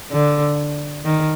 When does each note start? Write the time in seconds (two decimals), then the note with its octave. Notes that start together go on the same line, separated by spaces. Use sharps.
0.12 D3
1.04 D#3